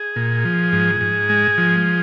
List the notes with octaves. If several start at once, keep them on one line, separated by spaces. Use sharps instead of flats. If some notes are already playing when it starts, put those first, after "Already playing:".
Already playing: G#4
A#2
F3
G#2
G#2
G#3
F3